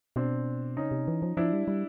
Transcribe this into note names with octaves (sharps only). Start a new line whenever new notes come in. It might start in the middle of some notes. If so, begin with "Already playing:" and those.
B2 C4 D4
C#3 C#4 D#4
C3
E3
F3
F3 D4 E4
G3
G3